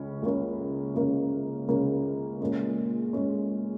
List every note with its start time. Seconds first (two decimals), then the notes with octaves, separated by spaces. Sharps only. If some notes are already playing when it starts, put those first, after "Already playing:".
Already playing: C#2 C#3 C#4
0.22 C#2 C#3 A#3 C#4
0.95 C#2 C#3 A#3 C#4
1.68 C#2 C#3 A#3 C#4
2.41 A#2 G#3 C#4
3.13 A#2 G#3 C#4